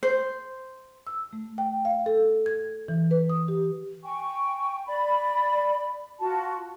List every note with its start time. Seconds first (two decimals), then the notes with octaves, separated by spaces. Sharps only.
0.03 C5
1.07 E6
1.33 A3
1.58 G5
1.85 F5
2.06 A4
2.46 G#6
2.88 E3
3.11 B4
3.30 D#6
3.48 G4
4.04 G5 G#5 C#6
4.86 D5 B5
6.19 F4 F#4 A5